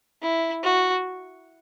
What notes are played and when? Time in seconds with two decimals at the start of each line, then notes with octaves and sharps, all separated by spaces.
0.22 E4
0.64 F#4